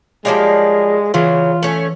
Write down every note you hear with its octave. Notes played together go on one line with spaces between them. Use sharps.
F3 G3 G#3 A#3 C#5 D5 F5
C#3 E3 F#3 F4
A3 C#4